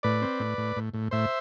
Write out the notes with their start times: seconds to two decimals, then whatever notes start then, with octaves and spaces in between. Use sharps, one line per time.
0.03 A2 B4 D5
0.22 C4
0.40 A2
0.58 A2
0.76 A2
0.94 A2
1.11 A2 C5 E5